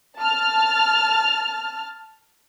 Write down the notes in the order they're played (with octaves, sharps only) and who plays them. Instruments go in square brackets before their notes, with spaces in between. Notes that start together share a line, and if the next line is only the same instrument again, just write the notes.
[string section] A5 F6